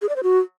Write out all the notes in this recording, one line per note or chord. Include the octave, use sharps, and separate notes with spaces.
G#4
D5
C5
F#4